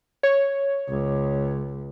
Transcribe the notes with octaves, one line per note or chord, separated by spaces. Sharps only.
C#5
C#2